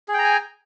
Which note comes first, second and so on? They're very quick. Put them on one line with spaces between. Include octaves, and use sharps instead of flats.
G#4 G5 A#5 G#5